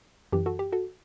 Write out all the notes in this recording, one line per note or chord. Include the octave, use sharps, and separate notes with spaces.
F#2 E3 G4
F#4 A4
G4
F#4 A4